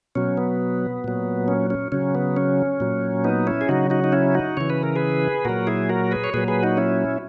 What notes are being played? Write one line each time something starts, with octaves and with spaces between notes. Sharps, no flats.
B2 F#3 C#4
B3
A#2 F#3
C#4
C#4
C#3 F#3 C#4
B3
C#4
A#2 F#3
B3 D#4
C#4 E4
G#4
C#3 F#3 D#4 F#4
D#4 F#4
D#4
C#4 E4
D#4 F#4
C#3 E3 C#5
B4
A#4
G#4 B4
A#2 F#3 F#4 A#4
E4 G#4
F#4 A#4
G#4 B4
C#5
A#2 F#3 G#4 B4
G#4 B4
D#4 F#4
C#4 E4